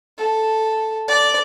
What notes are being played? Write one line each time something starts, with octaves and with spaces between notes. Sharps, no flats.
A4
D5